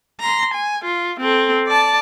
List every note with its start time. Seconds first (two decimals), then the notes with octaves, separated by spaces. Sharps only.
0.20 A#5 C6
0.53 G#5
0.84 F4
1.20 C4 A4
1.67 D5 A5